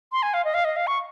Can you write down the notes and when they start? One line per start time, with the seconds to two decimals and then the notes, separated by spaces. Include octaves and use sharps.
0.12 C6
0.23 G#5
0.34 F5
0.44 D#5
0.54 F5
0.65 D#5
0.76 F5
0.87 C#6